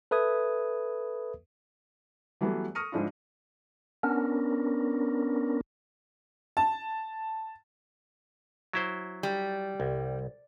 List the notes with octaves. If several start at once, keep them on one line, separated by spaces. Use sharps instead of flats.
A4 B4 E5 D#6 G#6
E3 F#3 G3 A3 B3
C#6 D#6 F6 A#6 C#7 D#7
G#2 F3 G#3 D4 E4 F4
B3 C#4 D4 A#4
A5
F#3 E4 C5
G3
C2